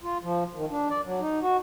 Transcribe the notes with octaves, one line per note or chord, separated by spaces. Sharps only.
F4
F3
D#3
D4
D5
F#3
D#4
F#4